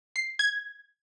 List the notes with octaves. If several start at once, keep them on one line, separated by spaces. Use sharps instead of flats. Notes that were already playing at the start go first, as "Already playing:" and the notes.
C7
G#6